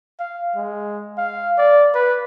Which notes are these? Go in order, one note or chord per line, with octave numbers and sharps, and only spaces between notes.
F5
G#3
F5
D5
B4